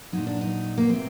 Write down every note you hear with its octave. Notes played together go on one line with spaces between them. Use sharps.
A#2 F#3 D#4
D4
D#4
A#3
C3 F#3 C4